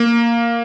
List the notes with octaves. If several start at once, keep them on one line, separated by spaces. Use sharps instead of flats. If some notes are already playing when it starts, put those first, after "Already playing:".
Already playing: A#3